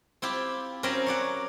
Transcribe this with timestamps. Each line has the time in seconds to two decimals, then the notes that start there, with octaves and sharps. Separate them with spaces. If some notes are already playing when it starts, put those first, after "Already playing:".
0.22 C4 E4 F4 G4
0.83 F#3 C4 C#4 A#4
1.07 C#5 D5 F#5